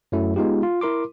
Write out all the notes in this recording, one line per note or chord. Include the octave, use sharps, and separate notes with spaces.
F#2 F#3 A3 E4
G#3 B3 D#4 F4 G4
F4
E4 A#4 C6 D6